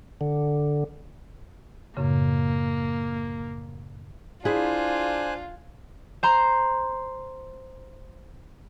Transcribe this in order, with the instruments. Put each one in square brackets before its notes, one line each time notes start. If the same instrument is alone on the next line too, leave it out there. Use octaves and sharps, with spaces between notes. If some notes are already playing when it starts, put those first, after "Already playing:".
[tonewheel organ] D3
[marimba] F#2 A2 C#3 [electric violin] A#3
[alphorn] D4 [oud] E4 G#4 [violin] F4 [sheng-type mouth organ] C5 G#5 F#6
[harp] C5 A#5 C6